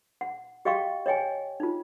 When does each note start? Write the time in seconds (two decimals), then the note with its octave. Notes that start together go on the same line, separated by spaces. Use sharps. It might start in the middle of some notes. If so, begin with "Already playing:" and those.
0.21 F#5
0.65 G4 D#5 F5 G5 C#6
1.06 C#5 D#5 G5 G#5
1.60 D#4 F4